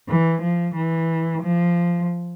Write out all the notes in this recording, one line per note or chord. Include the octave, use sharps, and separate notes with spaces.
E3
F3
E3
F3